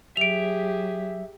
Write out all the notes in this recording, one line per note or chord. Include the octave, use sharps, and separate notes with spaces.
F#3 G4 G#4 E5 D7 F7